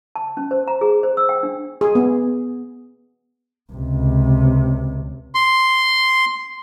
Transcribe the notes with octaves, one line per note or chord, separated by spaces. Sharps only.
A5
C#4
C5
A#5
G#4
C5
E6
G5
D4
G#4
B3
C#2 C3
C6